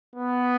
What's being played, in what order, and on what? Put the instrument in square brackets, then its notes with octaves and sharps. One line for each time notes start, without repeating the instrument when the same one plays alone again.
[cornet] B3